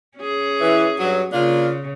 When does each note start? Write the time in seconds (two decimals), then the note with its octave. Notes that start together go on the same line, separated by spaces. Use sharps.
0.18 C#4 G#4
0.61 E3
1.00 G2 F#3
1.32 C#3 A#3 D4 F4